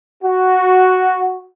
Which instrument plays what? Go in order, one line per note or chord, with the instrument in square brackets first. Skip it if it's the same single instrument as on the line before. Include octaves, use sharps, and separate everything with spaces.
[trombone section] F#4